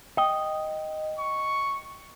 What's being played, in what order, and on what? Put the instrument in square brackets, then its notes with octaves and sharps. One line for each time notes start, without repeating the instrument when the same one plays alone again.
[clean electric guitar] D#5 [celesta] G5
[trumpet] C#6